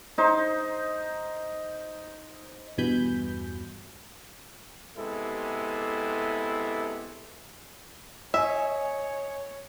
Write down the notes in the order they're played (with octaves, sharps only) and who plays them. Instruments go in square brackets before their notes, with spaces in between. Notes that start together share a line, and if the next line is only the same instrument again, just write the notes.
[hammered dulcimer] D#4 C5
[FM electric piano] E2 G2 B2 G#5 B5 G6
[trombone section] C3 G#3 B3 E4 G4 A4
[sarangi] C#5 [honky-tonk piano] D#5 G#5 [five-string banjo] E5